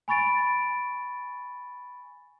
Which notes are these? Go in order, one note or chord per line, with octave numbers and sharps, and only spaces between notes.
G#5 B5 C#6 A6 D7